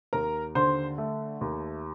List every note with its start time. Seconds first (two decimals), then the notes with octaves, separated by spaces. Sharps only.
0.13 D#2 A#4 A#5
0.55 D3 C5 C6
0.98 A3
1.41 D#2